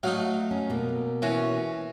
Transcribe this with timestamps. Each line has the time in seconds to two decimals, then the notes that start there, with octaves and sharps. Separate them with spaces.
0.03 F#3 A3 D#4 F5
0.51 C#4
0.70 B2 A#3
1.22 E3 C#4 F#4